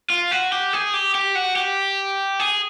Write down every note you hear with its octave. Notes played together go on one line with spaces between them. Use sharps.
F4
F#4
G4
G#4
G4
G4
F#4
G4
G#4